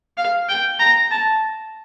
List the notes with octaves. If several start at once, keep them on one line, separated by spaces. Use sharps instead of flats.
F5
G5
A#5
A5